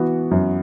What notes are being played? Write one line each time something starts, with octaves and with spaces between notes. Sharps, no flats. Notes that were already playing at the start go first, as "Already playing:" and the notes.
Already playing: E3 B3 F#4
F#2